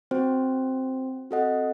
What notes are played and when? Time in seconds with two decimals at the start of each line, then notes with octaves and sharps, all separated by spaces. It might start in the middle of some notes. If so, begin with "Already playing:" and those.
0.11 C4 F#4 C5 G5
1.31 C4 F#4 A4 D#5 F#5